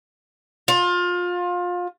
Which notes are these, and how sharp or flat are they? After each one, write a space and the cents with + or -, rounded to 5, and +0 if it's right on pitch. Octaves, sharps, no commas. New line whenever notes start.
F4 +25